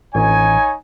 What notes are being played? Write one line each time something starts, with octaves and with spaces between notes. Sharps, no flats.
A1 D#4 C#5 G#5